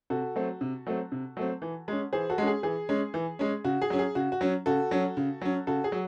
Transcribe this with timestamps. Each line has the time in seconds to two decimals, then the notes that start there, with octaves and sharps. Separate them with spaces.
0.10 C3 F#4 A4
0.36 F#3 A3 C4
0.61 C3
0.87 F#3 A3 C4
1.12 C3
1.37 F#3 A3 C4
1.62 E3
1.88 G#3 C#4
2.13 E3 G#4 C5
2.30 F#4 A4
2.38 G#3 C#4
2.47 G#4
2.63 E3 G#4
2.89 G#3 C#4
3.14 E3
3.39 G#3 C#4
3.64 C#3 F#4
3.82 G#4
3.90 F#3 C#4
3.99 G#4
4.15 C#3 F#4
4.32 F#4
4.41 F#3 C#4
4.66 C#3 F#4 A4
4.91 F#3 C#4
5.17 C#3
5.42 F#3 C#4
5.67 C#3 F#4 A4
5.84 G#4
5.92 F#3